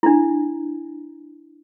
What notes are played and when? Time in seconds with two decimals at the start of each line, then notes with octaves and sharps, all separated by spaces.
0.03 D4 E4